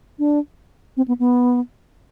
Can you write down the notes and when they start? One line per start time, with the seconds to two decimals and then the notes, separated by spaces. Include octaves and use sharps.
0.19 D4
0.97 C4
1.08 B3
1.20 B3